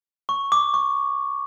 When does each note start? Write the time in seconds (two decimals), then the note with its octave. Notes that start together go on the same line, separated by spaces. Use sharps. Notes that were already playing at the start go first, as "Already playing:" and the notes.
0.29 C#6
0.52 D6
0.74 C#6